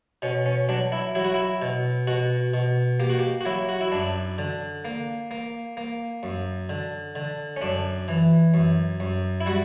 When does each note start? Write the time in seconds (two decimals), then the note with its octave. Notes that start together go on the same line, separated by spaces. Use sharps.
0.22 B2 C#4
0.46 C#4
0.69 F#3 D4
0.92 E4
1.15 F#3 E4
1.25 F#4
1.34 E4
1.62 B2
2.07 B2 F#4
2.54 B2
3.00 A#3 G4
3.10 F#4
3.19 G4
3.41 F#4
3.46 F#3 E4
3.69 F#4
3.81 E4
3.92 F#2 D4
4.38 D3
4.85 A#3
5.31 A#3
5.77 A#3
6.23 F#2
6.69 D3
7.16 D3
7.57 C#4
7.62 F#2 D4
8.08 E3
8.54 F#2
9.00 F#2
9.41 E4
9.46 G3 F#4